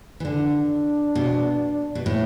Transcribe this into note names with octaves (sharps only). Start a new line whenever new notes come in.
E3
D3 D4
B2
B2
A2